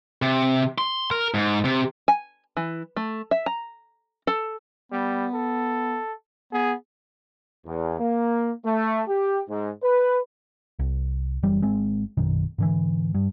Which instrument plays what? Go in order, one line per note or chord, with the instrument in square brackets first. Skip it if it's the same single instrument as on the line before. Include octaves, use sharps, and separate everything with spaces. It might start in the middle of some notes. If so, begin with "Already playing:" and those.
[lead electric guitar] C3
C6
A#4
G#2
C3
[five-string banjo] G#5
E3
A3
E5
A#5
A4
[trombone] G3 [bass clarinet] B3
[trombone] A4
[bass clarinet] B3 [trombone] G#4
[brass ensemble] E2
A#3
A3
G4
G#2
B4
[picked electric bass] C2
F#1 E3 G3
G#1 G#3 C4
A#1 F#2 B2 D#3
G#2 D3 E3
G2